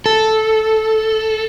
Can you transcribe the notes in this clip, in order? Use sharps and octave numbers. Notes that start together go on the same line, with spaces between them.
A4